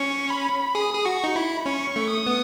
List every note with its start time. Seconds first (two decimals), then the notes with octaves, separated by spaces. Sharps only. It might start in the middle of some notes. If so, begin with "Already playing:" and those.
Already playing: C#4 C#6
0.30 B5
0.75 G#4 D#6
0.94 G#4
1.05 F#4 C#6
1.24 D#4
1.36 E4 B5
1.66 C#4 C#6
1.96 A3
2.11 D#6
2.27 B3